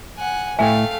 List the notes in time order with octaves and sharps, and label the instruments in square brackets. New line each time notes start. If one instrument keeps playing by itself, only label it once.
[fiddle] F#5 G#5
[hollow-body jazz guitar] A2 E5 [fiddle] A3 F5 [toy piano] G5 G#5